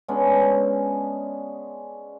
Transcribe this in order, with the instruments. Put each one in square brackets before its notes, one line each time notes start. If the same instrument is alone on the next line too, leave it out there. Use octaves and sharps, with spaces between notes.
[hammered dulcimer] G#3 B3 C#4 D4